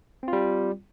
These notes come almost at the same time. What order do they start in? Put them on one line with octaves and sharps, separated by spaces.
C4 F4 G3